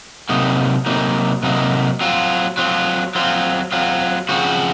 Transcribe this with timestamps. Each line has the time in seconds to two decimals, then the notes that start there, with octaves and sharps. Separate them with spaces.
0.29 C3 F#3 A#3 D#4
0.86 C3 F#3 A#3 D#4
1.43 C3 F#3 A#3 D#4
2.01 F#3 C4 F4
2.57 F#3 C4 F4
3.15 F#3 C4 F4
3.72 F#3 C4 F4
4.29 C#3 F3 C4 F#4